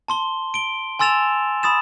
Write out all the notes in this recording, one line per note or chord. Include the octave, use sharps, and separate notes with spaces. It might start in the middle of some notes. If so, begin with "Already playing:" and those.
A5 C6 G7
D7 G7
G#5 C6 E6 A6 E7 F7
B5 D#6 A6 E7